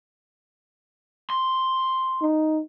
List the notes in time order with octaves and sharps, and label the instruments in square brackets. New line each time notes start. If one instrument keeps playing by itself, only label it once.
[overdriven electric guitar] C6
[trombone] D#4